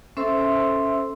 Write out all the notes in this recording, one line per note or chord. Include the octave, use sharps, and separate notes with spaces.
C#4 A4 C5 E5 C6 E6